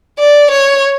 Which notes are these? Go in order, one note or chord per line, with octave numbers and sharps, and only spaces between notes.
D5
C#5